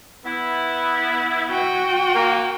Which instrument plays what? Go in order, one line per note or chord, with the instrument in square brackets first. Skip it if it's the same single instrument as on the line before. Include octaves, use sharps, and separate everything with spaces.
[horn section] B3 E4
[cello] F#4 G5
[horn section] A#3